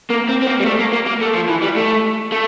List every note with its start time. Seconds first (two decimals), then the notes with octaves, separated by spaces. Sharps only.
0.10 A#3
0.29 C4
0.42 C4
0.47 A#3
0.60 G3
0.66 A3
0.79 A#3
0.93 A#3
1.07 A#3
1.21 A3
1.35 F3
1.50 E3
1.63 G3
1.77 A3
2.32 A3